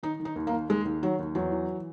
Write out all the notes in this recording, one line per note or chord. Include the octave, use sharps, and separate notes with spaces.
D#3 D#4
D#3
D#4
D#2
A#3
D#2
D#2 G#3
D#2
D#3 F#3
D#2
E2 F#3
E3